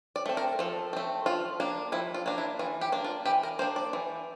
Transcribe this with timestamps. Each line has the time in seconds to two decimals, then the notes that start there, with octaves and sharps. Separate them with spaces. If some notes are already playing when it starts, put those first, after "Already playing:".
0.16 D5
0.26 A3 C4
0.37 A#4
0.59 F3 A4
0.93 A3 C4
1.26 F3 F4
1.60 A#3 D4
1.92 F3 E4
2.14 F4
2.26 A#3 D4
2.38 E4
2.59 E3 F4
2.81 G4
2.92 A#3 D4
3.04 F4
3.25 E3 G4
3.43 A#4
3.59 A#3 C5
3.62 D4
3.76 D5
3.93 E3